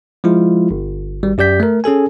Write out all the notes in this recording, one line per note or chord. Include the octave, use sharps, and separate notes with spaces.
F3 G#3 E4 F4
G1
G#1 G3
F#2 G4 D5 G6 B6
A3 A#4
C#4 G#4 A4 G#5